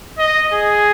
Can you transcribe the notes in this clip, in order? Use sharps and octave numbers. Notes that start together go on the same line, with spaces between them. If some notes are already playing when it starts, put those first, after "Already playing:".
D#5
G#4